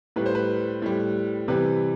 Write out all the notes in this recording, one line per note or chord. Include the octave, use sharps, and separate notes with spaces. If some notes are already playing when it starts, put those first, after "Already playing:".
A2 G3 B4
C5
B4
A2 G3
C3 E3 G3 B4